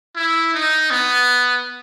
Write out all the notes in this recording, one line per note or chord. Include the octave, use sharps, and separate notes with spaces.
E4
D#4
B3